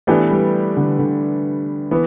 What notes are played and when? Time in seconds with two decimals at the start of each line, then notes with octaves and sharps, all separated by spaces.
0.07 E3 A3 B3 D4 G4
0.30 G3
0.77 D3
0.99 D3
1.91 E3 B3